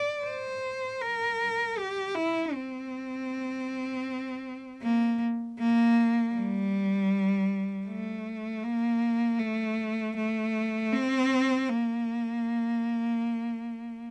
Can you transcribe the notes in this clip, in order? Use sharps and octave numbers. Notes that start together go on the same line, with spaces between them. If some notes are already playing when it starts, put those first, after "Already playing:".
Already playing: D5
C5
A#4
G4
E4
C4
A#3
A#3
G3
A3
A#3
A3
A3
C4
A#3